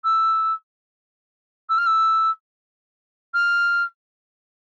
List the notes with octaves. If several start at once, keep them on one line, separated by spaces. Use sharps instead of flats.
E6
E6
F6
E6
F6